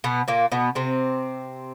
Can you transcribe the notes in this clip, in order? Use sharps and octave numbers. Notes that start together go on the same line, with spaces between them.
B2 B3
A#2 A#3
B2 B3
C3 C4